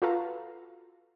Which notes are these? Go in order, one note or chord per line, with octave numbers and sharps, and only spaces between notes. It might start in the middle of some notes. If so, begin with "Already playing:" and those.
F4 F#4 A4 B4 F5 A#5